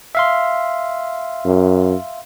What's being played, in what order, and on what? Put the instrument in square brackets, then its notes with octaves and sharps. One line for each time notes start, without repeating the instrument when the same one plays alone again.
[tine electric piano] E5 F5 C6
[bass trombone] F#2